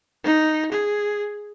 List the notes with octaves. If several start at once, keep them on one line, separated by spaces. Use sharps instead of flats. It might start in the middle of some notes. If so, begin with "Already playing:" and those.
D#4
G#4